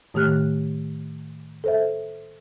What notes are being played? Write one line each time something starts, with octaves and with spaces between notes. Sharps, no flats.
A2 D#3 A3 G4 F6 F#6
A4 C5 E5